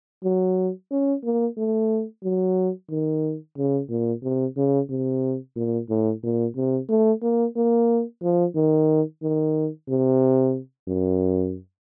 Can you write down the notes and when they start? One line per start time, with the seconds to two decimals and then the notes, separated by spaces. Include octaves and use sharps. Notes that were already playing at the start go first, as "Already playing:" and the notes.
0.24 F#3
0.91 C#4
1.23 A#3
1.57 A3
2.24 F#3
2.89 D#3
3.57 C#3
3.89 A#2
4.23 C3
4.57 C#3
4.90 C3
5.56 A#2
5.89 A2
6.23 A#2
6.56 C3
6.89 A3
7.22 A#3
7.56 A#3
8.22 F3
8.55 D#3
9.22 D#3
9.89 C3
10.88 F#2